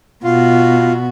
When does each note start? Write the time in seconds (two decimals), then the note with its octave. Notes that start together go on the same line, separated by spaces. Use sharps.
0.24 B2 F4 F#4